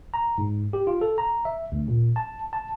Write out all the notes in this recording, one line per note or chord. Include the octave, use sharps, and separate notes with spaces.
A#5
G#2
G4
F4
A4
A#5
E5
D2
A#2
A5
A5